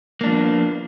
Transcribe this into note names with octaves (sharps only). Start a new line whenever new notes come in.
F3 A#3 B3 D4